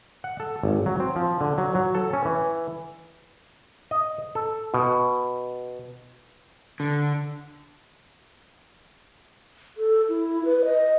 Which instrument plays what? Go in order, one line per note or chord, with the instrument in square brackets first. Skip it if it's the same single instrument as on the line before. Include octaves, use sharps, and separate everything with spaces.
[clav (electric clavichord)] F#5
A4
G#1
F#3
C4
F3
D3
F#3
F#3
A4
C#4
E3
D#5
A4
B2
[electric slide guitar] D3
[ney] A4
E4
B4
D#5